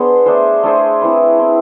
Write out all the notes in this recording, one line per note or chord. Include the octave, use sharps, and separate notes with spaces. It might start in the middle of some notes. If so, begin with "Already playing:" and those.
Already playing: B3 D4 G#4 C5
A3 D4 G#4 C5
A3 D4 G#4 C5
C4 E4 B4
C4 E4 B4